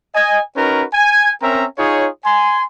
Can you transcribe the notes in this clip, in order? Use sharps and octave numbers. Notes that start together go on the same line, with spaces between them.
D#5 G#5
C#4 D#4 F#4 A#4 B4
G#5
C4 C#4 A#4 E5 A#5
D#4 F4 G#4 C#5
G#5 C6